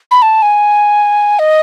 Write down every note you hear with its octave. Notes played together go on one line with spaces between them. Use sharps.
B5
A5
G#5
D#5